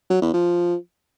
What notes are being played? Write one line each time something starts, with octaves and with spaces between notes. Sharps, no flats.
F#3
E2
F3